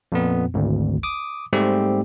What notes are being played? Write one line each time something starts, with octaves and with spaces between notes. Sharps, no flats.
F2 A#2 B3
G#1 D2
D6 D#6
G#2 G3 A3 C4 G4